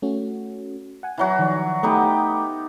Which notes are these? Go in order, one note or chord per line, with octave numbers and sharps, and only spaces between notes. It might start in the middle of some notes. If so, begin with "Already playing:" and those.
A3 C#4 F#4
F#5 G#5
E3 F#3 F#4
D#3 F3 D5
A3 B3 D#4 G4